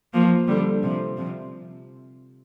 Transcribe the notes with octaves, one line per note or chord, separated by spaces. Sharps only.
F3 A#3
D3 G3
C3 F3
C3 F3